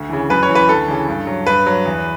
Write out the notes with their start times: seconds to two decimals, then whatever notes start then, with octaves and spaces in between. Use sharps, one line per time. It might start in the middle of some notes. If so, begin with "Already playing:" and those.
Already playing: D2
0.09 C#3 E3
0.30 F#2 B4
0.43 C#5
0.49 E3
0.55 B4
0.68 D2 A4
0.88 C#3 E3
1.08 G2
1.27 F#3
1.47 G2 B4
1.66 F#3
1.86 E2